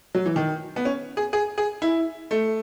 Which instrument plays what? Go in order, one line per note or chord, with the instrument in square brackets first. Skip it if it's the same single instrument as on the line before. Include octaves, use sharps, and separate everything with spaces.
[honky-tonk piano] F#3
E3
D#3
B3
C#4
G#4
G#4
G#4
E4
A3